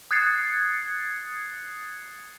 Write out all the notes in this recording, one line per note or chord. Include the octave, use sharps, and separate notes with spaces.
D#6 F#6 G#6 A6 C7 C#7